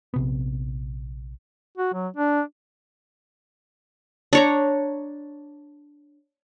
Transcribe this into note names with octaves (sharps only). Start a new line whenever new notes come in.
A#1 C3 B3
F#4
F#3
D4
D4 C#5 A#5